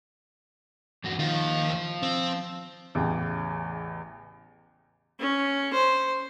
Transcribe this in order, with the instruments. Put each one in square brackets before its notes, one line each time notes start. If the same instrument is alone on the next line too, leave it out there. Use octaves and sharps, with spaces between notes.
[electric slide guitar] E2 G2 F#4
[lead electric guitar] D#2 D#3 [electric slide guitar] F3 F4
[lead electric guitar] C4
[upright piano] A1 E2 C#3
[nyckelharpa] C#4
C5